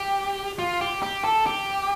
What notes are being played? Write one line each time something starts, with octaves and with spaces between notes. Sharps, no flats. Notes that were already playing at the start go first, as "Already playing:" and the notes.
Already playing: G4
F4
G4
G4
A4
G4